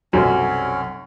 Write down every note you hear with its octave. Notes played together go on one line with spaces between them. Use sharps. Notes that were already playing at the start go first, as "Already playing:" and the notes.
B1 F#2 C3 F#3 G3 C#4 A4 G#5